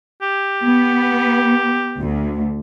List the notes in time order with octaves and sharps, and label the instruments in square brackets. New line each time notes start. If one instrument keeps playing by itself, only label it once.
[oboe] G4
[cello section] B3
D2